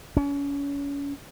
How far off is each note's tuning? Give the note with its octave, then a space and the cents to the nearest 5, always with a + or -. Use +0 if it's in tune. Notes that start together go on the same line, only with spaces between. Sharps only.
C#4 +35